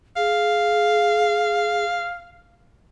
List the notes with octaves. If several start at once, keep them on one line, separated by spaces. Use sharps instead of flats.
G#4 F5